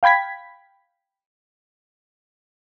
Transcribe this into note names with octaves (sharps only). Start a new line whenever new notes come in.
F5 G5 B5 G#6 B6